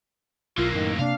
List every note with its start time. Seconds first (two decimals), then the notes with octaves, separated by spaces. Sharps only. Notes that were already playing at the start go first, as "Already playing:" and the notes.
0.58 B1 E3 A#3 F4
0.73 F#2 A2 D#3
0.99 C3 A#3 D4 F5